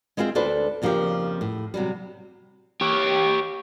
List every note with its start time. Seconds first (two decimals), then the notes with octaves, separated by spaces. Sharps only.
0.17 G#3 B3 C4 F4 G#4 E5
0.35 D2 D4 A4 B4 C5
0.82 F2 C#3 F3 A#3 D4 G4
1.41 A2
1.74 C3 F#3 G3
2.81 G4 C#5